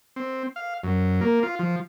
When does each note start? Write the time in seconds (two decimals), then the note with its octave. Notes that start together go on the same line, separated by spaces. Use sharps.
0.16 C4
0.56 F5
0.84 F#2
1.21 A#3
1.43 F4
1.59 F3